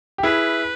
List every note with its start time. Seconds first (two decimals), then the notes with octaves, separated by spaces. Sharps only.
0.18 G4
0.23 E4 G#4 B4